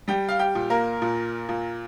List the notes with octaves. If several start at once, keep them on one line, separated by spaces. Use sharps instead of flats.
G3 G4 G5
F5
G4 G5
A#2
A#3 A#4
A#2
A#2